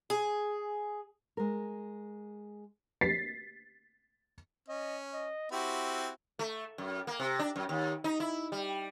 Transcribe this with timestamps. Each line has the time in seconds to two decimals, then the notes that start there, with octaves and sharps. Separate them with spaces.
0.10 G#4
1.37 G#3 A#4
3.01 A6 B6 C7
4.68 C#4 D#5
5.13 D#5
5.52 C4 E4 F#4 G4
6.39 A3
6.78 F#2
7.07 A#3
7.20 C3
7.39 D4
7.56 F#2
7.69 D#2
8.04 D#4
8.20 E4
8.52 G3